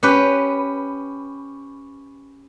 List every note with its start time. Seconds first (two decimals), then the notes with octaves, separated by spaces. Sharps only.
0.03 C#4 G4 B4